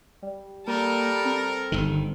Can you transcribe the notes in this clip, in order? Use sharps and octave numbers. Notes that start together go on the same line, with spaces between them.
G3
G3 A#3 A4 A#4
C4
G1 D#3